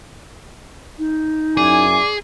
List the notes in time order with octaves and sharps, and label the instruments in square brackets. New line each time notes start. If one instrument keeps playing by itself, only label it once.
[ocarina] D#4
[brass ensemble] F#2 E4 G#5 [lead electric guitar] G#4 [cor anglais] D5